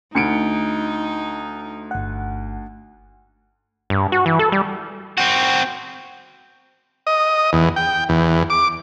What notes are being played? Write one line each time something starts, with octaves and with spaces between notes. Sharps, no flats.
D2 D#4 C#7 D7
G1 F#5
G2
F#4
E3
A4
G3
C4 F#4
D#5
E2
G5
E2
D6